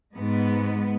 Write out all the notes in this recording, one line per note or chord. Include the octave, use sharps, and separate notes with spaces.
G#2 B3